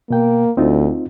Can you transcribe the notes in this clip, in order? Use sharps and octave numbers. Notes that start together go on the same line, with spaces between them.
B2 A#3 G5
D2 C4 D#4 F4